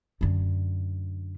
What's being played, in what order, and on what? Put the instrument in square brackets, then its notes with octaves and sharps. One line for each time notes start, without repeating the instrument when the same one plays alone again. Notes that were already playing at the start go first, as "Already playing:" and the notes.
[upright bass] F#2 D3